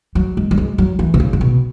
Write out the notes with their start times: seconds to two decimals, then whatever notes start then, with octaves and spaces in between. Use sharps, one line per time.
0.15 F#3
0.37 G#3
0.51 F#3
0.58 G#3
0.78 F#3
0.99 E3
1.14 B2
1.20 C#3
1.33 G#2
1.41 B2